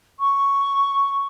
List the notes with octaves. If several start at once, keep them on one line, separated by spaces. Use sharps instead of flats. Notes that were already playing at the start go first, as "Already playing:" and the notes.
C#6